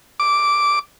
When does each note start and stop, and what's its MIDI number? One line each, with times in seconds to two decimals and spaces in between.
0.20 0.79 86